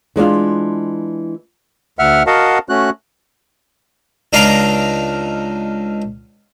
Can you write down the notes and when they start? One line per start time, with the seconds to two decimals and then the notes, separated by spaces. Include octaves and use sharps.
0.16 E3 G#3 D4 F4
1.99 D2 E5 F#5 F6
2.27 F#4 A#4 D#5 F5 F#5 A5
2.69 A3 C#4 F#4 F#6
4.33 C#2 D4 D#4 F5 A#5 D6